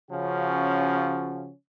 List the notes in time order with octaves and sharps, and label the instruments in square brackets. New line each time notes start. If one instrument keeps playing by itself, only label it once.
[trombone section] C#3 F3 C#4 F#4